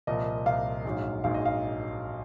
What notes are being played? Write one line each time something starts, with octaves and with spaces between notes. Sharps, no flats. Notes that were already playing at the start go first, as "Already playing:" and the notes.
C2 A#2 F3 D#5
C2 A#2 F3 F5
A#1 G#2 F#3
A#1 G#2 F#3 F5
D#5
F5